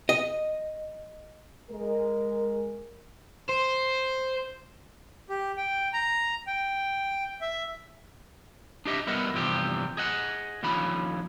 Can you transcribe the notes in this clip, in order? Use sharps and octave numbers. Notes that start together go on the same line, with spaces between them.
D#5
G#3 A#4
C5
G4
G5
A#5
G5
E5
D4 G4 D#5 E5
G3 B3 A#4 D#5 E5 F#5
E2 G2 C3 F3 C4 G4
G#4 D#5 F#5
D#2 D3 F3 C#4 B5